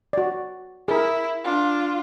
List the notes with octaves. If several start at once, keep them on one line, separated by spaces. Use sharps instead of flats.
F#4 D5
E4 G#4 A#4
D4 F4